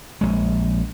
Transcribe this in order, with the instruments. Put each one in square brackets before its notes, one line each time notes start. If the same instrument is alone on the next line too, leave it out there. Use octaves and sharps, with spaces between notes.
[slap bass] A#1 G#3